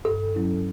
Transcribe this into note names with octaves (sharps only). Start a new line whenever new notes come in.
G2 A4
F#3 C#4 E4